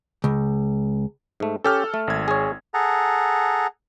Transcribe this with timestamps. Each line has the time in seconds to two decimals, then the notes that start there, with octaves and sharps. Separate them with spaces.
0.24 C#2
1.40 G#2 A3
1.64 C#4 G4 A4 F6
1.94 A3
2.07 G#1 G#6
2.28 G#4 C#5
2.74 G#4 A4 F#5 A#5